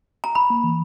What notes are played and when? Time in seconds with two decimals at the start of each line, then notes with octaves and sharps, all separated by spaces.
0.24 A#5
0.35 G1 B5
0.50 A#3
0.64 E3